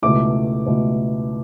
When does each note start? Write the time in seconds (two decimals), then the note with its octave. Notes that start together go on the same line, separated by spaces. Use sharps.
0.02 C#2 B2 A3 E4 D6
0.66 C#2 B2 A3 E4